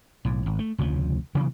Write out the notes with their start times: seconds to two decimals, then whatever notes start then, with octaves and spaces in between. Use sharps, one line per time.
0.25 B1 A2
0.46 G#1
0.59 A3
0.78 F1 D2 C#3 F3
1.35 C3 E3 F#3 A#3